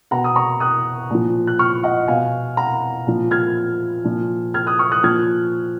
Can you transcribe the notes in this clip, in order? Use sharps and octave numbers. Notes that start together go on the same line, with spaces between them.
B2 F#5 A#5
D#6
A#5 C#6
D#6 F#6
A#2 F3
F#6
C#6 F6
D#5 F#5
B2 F5 G#5
F#5 A#5
A#2 F3
F6 G#6
A#2 F3
F6 G#6
D#6 F#6
C#6 F6
D#6 F#6
A#2 F3 F6 G#6